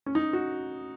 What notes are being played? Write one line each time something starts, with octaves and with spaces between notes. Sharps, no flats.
C#4
D#4
F#4